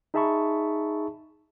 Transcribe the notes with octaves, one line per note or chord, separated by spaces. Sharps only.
D#4 G#4 E5 A5 B5 C#6